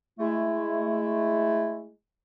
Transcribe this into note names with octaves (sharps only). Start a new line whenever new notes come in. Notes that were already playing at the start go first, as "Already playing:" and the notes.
G#3 A3 E4